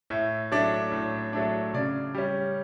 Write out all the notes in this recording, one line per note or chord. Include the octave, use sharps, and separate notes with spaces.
A2 E5
F#3 A3 D4 D5
A2
F#3 A3 D4
C#3 D5
G3 C#4